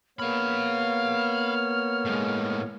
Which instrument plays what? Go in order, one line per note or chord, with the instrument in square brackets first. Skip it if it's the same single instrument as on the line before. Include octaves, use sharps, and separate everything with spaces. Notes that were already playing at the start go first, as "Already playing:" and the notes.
[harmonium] A#3 B3 C#5 [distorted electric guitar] F5 B5 [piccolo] F6
[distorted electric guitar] A2 G#3